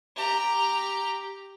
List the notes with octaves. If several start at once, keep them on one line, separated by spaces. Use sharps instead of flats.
G4 A#5